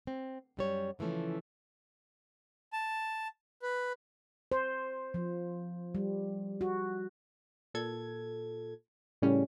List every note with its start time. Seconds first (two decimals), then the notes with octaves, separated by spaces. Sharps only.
0.07 C4
0.57 F#2 G3 C#5
0.99 C#3 E3 F3 A3 C#4
2.73 A5
3.62 B4
4.52 C5
5.14 F3
5.95 G3
6.61 F#4
7.74 A#2 A4 G#6
9.22 A2 C#3 G3 C#4